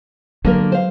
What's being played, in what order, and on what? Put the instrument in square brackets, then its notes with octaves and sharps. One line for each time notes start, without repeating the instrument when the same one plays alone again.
[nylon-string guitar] D3 A#3 A#4 [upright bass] F#3 G#3
[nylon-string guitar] C5 F5